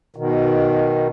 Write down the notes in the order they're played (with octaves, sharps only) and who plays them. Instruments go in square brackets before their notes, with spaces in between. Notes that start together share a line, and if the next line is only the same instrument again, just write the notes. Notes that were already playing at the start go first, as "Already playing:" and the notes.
[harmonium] B2 D#3